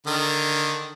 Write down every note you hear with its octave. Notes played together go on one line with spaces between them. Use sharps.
D3 D#3